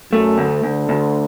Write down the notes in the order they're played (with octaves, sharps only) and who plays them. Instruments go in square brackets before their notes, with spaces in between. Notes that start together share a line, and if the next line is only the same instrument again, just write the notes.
[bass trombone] F#2 [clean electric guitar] A3
[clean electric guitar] D2
[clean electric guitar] D2 [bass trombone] D3
[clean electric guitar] D2